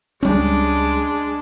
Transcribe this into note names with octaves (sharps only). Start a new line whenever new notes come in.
C#2 G3 G#3 C#4 D4